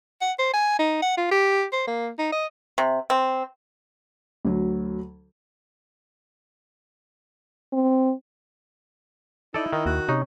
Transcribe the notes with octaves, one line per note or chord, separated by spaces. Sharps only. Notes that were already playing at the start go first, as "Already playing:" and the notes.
F#5
C5
G#5
D#4
F#5
F4
G4
C5
A#3
D#4
D#5
C3
C4
D2 F#3
C4
D#4 E4 A4 D5
D#3 D#4
D#2 F#4
C3 C#4 D#4